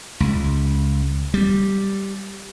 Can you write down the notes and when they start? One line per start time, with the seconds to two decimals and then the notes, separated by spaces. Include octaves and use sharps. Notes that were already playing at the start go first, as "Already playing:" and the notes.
0.20 C#2
1.34 G3